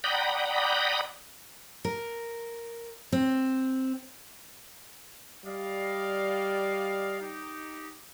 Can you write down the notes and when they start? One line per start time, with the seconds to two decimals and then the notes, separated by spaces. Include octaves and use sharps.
0.04 D5 F#5 G5 A#5 B5 D#6
1.85 A#4
3.12 C4
5.45 G3 D5 D#5 F5
7.20 D#4 G4